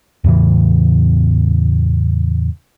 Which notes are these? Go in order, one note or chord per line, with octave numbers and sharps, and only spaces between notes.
E2 A2 C#3 E3